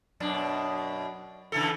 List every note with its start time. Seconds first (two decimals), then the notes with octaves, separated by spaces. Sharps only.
0.20 F#2 B2 D4
1.52 C#3 E3 A4